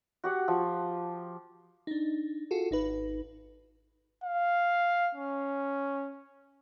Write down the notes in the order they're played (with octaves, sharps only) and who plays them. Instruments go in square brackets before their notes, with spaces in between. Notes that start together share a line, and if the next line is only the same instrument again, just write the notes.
[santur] F#4 G4 F#5
F3
[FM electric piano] D4 D#4
F4 F#4 G#4 A4
G#1 D#4 B4
[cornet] F5
C#4